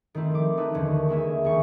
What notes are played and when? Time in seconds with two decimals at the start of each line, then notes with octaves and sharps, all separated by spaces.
0.15 D#3 A3 C4 E4
0.32 F3 D6
0.57 A3 D#4 B4 A5
0.74 D#2 D3 D#3 C#4
1.09 G#3 A#3 E5 G#5
1.44 C#2 D#3 C#6